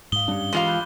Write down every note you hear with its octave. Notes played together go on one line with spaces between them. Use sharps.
G#2 F5 D#6 G7
G2 G3 C#4 D4 G4
E3 G#3 F4 F5 C6 D6
B5 F#6 G6